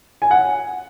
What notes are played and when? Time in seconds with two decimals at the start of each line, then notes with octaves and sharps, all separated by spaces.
0.22 G#5
0.31 F#5